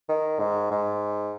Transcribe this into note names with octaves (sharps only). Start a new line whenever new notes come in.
D#3
G#2
G#2